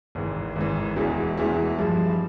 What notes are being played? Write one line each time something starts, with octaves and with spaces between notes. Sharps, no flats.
G#1 G#2 E3
G#1 G#2 E3
E1 E2 E3 G#3 E4
E1 E2 E3 G#3 E4
G2 F3 G#3